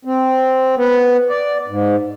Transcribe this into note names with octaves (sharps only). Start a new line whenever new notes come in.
C4
B3
D5
G#2